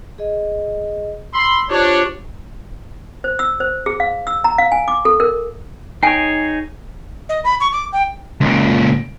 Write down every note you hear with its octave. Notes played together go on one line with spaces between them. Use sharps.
G#4 D#5
B5 C6 E6
D4 F4 G4 C5 C#5
C5
E6
C5
G#4
F5
E6
A#5
F5
G#5
D6
A4
A#4
D#4 G#4 C#5 G5 G#5 C7
D#5
B5
C#6
D6
G5
C#2 A#2